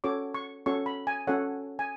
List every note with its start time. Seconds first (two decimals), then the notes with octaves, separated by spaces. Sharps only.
0.04 C#4 F#4 A4 C#5 D6
0.34 C#6
0.66 C#4 F#4 A4 C#5 C#6
0.86 B5
1.07 G#5
1.27 C#4 F#4 A4 C#5 F#5
1.79 G#5